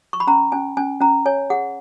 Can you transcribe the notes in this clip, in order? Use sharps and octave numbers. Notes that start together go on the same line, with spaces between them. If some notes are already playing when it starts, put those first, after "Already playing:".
C#6
B5
C#4 A#5
C#4 G#5
C#4 G#5
C#4 A#5
C#5 G#5
G#4 F#5